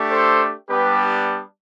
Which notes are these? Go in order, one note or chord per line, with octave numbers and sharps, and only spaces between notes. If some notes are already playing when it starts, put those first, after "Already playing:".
Already playing: A3 D4 G4
A4 C5
G3 B3 D4 G4 B4